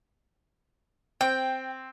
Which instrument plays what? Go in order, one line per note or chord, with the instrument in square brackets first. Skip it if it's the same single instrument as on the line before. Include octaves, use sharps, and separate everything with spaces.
[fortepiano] C4 [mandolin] G5